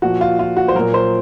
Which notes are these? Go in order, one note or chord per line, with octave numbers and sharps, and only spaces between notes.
A#2 F3 F#4
F4
F4
F#4
C5
A#2 F#3 A#4
C5